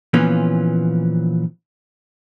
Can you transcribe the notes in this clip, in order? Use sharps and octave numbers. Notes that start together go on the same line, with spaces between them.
A#2 E3 F3 B3 C#4 F4